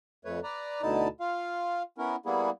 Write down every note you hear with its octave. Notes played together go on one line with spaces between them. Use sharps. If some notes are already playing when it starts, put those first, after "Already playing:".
F2 A3 B4 C#5
B4 D5 A#5
D2 B2 D3 D#4 E4 A5
F4 F5
B3 C#4 E4 A#4
G3 A#3 B3 E4 G#4